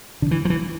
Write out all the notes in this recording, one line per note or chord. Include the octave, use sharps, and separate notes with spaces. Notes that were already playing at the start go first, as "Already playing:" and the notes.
D3
E3
F3
E3